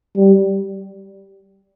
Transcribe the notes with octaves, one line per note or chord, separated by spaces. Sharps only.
G3